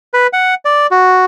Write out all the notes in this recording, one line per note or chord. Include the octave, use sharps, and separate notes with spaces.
B4
F#5
D5
F#4